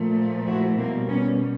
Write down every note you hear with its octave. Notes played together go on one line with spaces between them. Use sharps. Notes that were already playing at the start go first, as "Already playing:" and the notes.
Already playing: A#2 F3 A3
E4 F#4
B2 G3 A#3 C4
B3 C#4